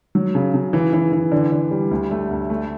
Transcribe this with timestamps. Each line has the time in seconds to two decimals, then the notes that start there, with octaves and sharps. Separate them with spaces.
0.15 F#3
0.35 C#3
0.54 C#3
0.73 E3
0.93 E3
1.12 E3
1.32 D3
1.52 D3
1.71 G3
1.91 D2
2.11 A3
2.31 D2
2.50 A3